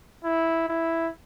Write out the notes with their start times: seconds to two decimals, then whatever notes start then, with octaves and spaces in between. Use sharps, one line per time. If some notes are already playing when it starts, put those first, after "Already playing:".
0.25 E4
0.69 E4